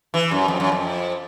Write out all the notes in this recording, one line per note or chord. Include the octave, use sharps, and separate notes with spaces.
E3
F#2
F2
F#2
F2